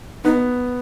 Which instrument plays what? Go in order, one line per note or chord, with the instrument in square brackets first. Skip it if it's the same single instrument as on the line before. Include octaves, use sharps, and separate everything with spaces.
[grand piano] B3 [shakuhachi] D#4